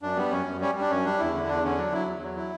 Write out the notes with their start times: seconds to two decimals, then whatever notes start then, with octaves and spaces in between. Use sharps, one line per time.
0.02 F#2 D4
0.16 G3 B3
0.31 F#2 C#4
0.46 F#2
0.61 G3 C#4
0.75 G3
0.81 D4
0.90 F#2 C#4
1.05 G3 D4
1.19 E2 E4
1.34 D3
1.48 E2 D4
1.64 D3 C#4
1.78 F#3 D4
1.92 F#3 E4
2.07 E2
2.22 F#3
2.36 E4